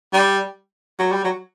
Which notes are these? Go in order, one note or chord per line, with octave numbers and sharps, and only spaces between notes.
G3
F#3
G3
F#3